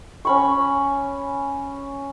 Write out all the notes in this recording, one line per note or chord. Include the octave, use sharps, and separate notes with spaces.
C#4 B5 C#6